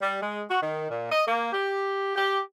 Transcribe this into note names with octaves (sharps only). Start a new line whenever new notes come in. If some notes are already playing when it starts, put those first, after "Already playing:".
G3
G#3
F#4
D#3
A#2
D#5
A#3
G4
G4